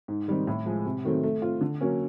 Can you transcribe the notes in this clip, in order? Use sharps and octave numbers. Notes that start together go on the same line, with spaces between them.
G#2
D#3 G3 C4 D#4
A2
F3 G#3
C3
D#3 F#3 A3 C4
A3
C4 F4
D3
F#3 A#3 C#4